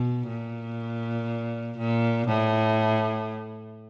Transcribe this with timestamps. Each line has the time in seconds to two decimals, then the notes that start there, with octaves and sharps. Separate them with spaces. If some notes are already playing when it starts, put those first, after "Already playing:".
Already playing: B2
0.28 A#2
1.78 A#2
2.28 A2